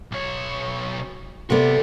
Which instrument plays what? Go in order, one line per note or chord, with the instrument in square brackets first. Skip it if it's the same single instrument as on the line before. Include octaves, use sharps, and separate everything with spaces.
[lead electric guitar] B1 C#5
[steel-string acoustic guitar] C3 B3 [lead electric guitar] F#4 D5 [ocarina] A4